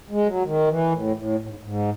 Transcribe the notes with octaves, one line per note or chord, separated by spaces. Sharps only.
G#3
F#3
D#3
E3
A2
A2
A2
G#2
G#2